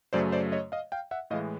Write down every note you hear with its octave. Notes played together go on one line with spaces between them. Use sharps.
F#2 C#3 F#3 A3 C5 D5
C5 D5
C#5 D#5
D#5 F5
F5 G5
E5 F#5
A2 E3 G#3 D#5 F5